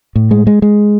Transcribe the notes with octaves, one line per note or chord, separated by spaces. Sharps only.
A2
G#3
G#3
G#3